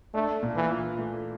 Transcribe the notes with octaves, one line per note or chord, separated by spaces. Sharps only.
A3 D4
A#2
E3
F4
A3